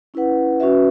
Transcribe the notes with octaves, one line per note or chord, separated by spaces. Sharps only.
C#4 E4 B4 F#5
C#4 F#4 B4 E5